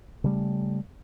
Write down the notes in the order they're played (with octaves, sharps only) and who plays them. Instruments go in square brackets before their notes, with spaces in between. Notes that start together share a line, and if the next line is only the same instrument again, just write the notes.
[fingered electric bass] C#3 G3 A3